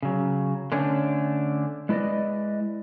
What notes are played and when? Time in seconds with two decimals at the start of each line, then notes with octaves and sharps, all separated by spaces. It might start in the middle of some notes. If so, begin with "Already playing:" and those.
0.03 C#3 F#3
0.72 D3 A3 C#4 D4 C#5
1.89 G#3 E4 B4 D5 D#5